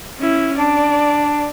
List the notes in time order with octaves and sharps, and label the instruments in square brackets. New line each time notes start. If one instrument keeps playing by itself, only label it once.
[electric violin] C#4 E4
[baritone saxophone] D4 [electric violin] D5